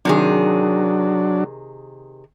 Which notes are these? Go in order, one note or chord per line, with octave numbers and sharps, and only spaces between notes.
C3 D#3 F#3 D4 G#4